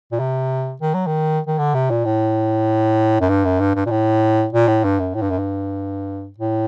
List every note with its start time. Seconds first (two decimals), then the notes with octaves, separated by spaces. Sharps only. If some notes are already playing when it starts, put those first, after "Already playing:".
0.12 A#2
0.19 C3
0.81 D#3
0.94 F#3
1.06 D#3
1.47 D#3
1.58 D3
1.74 C3
1.90 A#2
2.05 A2
3.20 F#2
3.29 G2
3.45 F#2
3.60 G2
3.75 G2
3.86 A#2
3.90 A2
4.53 A#2
4.68 A2
4.84 G2
4.99 F#2
5.14 A2
5.22 G2
5.30 F#2
5.38 G2
6.38 A2